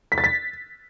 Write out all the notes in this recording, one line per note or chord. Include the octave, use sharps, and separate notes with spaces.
B6
A6
B6